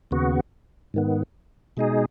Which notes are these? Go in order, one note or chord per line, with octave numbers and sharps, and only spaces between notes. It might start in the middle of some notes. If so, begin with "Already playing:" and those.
D#2 C#3 B3 F#4
G#2 D#3 B3
B2 G#3 D#4 G#4